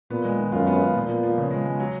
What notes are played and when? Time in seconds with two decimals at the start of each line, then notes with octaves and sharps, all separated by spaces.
0.10 A#2 B3
0.25 G#3
0.38 D#3
0.52 F#2 F4
0.67 B3
0.81 F4
0.95 A#2 F3
1.08 B3
1.23 F3
1.38 C#3
1.51 G#3
1.65 G#3
1.80 F#3